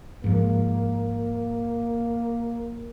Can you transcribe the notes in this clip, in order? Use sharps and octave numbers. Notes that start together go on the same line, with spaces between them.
G#2 F3 A#3